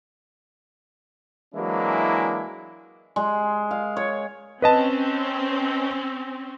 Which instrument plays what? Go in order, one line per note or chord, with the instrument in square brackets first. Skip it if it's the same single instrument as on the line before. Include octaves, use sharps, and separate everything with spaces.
[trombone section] E3 F#3 G#3 A#3 D4 E4
[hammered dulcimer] G#3
F5
C#5
[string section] C4 C#4 [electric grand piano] B4 D#5 A5